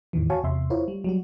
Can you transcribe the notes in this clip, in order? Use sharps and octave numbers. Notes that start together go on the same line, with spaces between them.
E2 A2 D#3 E3
F#4 C#5 F5 G#5 A5 C#6
E2 C3 E5 C6
E4 F4 A#4 C5 C#5
G3
F#3 G3 F#4